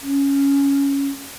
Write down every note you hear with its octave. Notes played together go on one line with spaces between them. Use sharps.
C#4